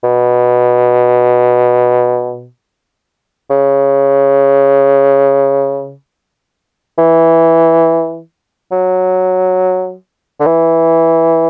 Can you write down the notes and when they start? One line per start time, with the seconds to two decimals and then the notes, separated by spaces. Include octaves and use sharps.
0.03 B2
3.50 C#3
6.98 E3
8.72 F#3
10.40 D3
10.46 E3